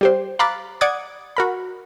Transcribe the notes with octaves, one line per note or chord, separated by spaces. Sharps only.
G3 G4 C5
F5 A#5 B5 D6 F#6 A6
D5 F#5 D6 D#6 G#6
F#4 A#4 B5